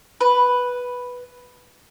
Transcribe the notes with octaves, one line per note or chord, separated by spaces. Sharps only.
B4